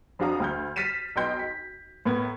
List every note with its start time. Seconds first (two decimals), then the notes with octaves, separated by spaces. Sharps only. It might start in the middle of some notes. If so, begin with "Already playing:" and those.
0.19 F2 D4 F#4 F5 A#5 D#6
0.40 D2 F6 G6
0.76 F6 A6 B6 C7 D#7 E7
1.16 B1 B3 D#5 G5 C6 G6
1.39 B6
2.05 A2 B3 A#4 G#6